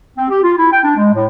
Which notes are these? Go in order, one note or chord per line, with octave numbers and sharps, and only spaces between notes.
C4
G4
F4
E4
G5
D4
G#3
A2